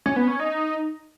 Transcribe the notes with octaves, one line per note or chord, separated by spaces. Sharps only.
C#4
B3
C#4
D#4